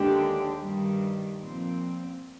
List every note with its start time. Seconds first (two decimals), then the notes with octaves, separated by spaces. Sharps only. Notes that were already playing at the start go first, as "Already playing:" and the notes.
Already playing: D#2 D3 G#3 D4 G4
0.60 G2 D#3 G3
1.39 A#2 F3 C4